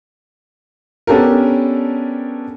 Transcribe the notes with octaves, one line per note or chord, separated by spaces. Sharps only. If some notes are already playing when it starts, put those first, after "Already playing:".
B3 C#4 D4 G4 A4 A#4